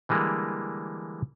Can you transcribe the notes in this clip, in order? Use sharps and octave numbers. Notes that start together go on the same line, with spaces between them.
D3 E3 G3 G#3 A#3